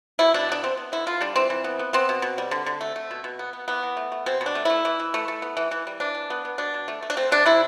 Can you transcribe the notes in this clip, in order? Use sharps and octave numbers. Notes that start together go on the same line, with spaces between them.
B2 E4
B2 D4
B3 D4
B3 C4
B3
D3 E4
D3 F4
G3 D4
E3 C4
E3
B3
B3
B3 C4
B2
B2
G3
D3
D3
A3
A3
B2
B2
B3
B3
E3 B3
E3
A3
A3
B2 C4
B2
D4
A3
A3 E4
E3
E3
A3
A3
B3
E3
E3
G3
E3 D4
E3
B3
B3
B2 D4
B2
A3
A3
D4
A3 C4
C3 D4
C3 E4